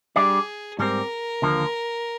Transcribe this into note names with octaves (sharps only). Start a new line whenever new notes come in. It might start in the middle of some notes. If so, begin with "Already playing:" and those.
G3 D4 G4 G#4 D5
G#2 G3 C4 A#4
D#2 D3 F3 A#3